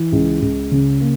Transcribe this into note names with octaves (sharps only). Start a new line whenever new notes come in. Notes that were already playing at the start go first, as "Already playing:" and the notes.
Already playing: E3
C#2
C#2
C#3
A#3